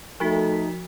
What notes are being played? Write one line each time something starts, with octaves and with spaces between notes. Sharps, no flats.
F3 A3 D#4 F#4 B6